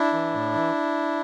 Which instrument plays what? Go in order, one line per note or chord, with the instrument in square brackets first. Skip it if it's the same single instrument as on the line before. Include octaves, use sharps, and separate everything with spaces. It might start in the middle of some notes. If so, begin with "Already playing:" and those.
Already playing: [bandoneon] D4 E4
E3
A2
E3